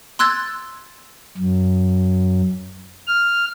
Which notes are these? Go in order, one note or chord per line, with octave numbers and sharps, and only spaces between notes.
C6 E6 F#6 G#6 A6
F#2
F6